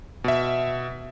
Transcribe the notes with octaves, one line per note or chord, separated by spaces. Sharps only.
B2 E5